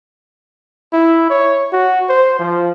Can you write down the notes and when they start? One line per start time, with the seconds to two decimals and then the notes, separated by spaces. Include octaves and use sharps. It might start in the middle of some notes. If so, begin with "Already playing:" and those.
0.93 E4
1.30 C#5
1.73 F#4
2.09 C5
2.39 F3